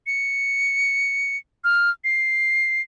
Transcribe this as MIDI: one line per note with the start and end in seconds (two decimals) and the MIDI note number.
0.07 1.37 97
1.64 1.90 89
2.04 2.82 96